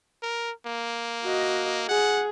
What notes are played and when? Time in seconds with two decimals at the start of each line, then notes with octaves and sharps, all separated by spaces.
0.23 A#4
0.66 A#3
1.24 F#4 D#5
1.89 G#4 F#5